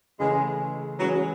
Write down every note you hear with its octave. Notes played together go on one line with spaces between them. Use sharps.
C#3 E3 G#3 A3 C#4
E3 F#3 G#3 C#4